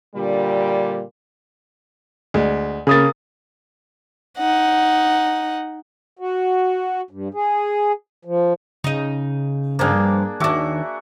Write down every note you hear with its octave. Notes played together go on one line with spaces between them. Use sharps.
A#2 D3 G3
D2 G#3
C#3 A#3 G#4 D#6 A6
D#4 F#5
F#4
G2
G#4
F3
C#3 D#4 D#5
G2 F3 A#3 D4 G#4
D#2 D#3 D4 F#4 E5 D6